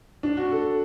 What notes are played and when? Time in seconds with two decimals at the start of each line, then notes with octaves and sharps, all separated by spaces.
0.23 D4
0.37 F#4
0.51 A4